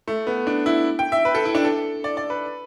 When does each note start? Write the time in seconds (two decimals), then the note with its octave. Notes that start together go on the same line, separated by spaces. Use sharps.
0.08 A3
0.27 B3
0.47 D4
0.66 E4
0.99 G5
1.12 E5
1.25 B4
1.35 A4
1.45 E4
1.55 D4
1.65 A4
2.04 D5
2.17 D5
2.30 B4